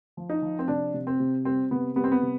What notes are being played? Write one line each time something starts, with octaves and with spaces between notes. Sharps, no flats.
F3
D#4
F3
C4
C3 D4
C3
C4
C3
G3 C4
C3 B3
G3 B3
C4
B3
C3